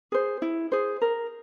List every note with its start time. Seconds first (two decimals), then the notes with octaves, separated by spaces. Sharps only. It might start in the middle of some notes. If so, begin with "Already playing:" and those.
0.12 G#4 C5
0.42 E4
0.72 G#4 C5
1.02 A#4